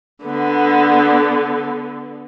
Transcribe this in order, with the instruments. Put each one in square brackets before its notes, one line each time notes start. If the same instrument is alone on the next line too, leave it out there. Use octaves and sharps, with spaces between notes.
[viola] D3 B3